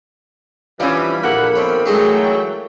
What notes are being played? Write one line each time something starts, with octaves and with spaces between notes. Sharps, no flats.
E3 F3 G3 C#4 D4 B5
A#1 G2 A#3 A4 F#5
B2 D#3 C4 C#4
E3 F#3 G#3 A3 C#4 D#4 G5